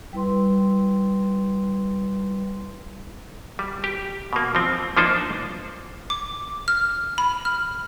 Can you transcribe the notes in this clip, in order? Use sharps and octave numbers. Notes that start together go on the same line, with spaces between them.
G3 E4 B4 C6
G3
G4
B2 A#3
F3 C4
F3 A#3 D4 D#4 C5
D6
F6
B5
F6